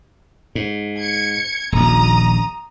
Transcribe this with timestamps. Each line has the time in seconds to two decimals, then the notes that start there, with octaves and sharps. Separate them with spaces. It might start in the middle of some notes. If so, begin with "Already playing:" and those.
0.55 G#2
0.99 G#6 C#7
1.72 D#1 A#1 A#5 D#6